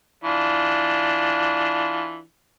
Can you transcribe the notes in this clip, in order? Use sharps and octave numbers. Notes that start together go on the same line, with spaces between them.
E3 D4 F4